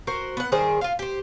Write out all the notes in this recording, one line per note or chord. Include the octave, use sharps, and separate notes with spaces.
F#4 A#4 C5
B3 F#5
D#3 G3 G#4 C5
F4 F5
G4 C5